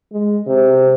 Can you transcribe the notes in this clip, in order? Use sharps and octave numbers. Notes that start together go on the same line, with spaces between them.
G#3
C3